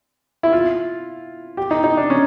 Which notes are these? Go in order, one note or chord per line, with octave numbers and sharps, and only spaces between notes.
E4
F4
G4
D#4
D#4
D4
C#4